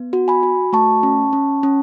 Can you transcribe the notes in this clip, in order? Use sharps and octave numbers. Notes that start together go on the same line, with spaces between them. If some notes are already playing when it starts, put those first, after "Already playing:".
Already playing: B3
F#4
G#5 B5
F#4
A3 A5 C#6
C#4
C#4
C#4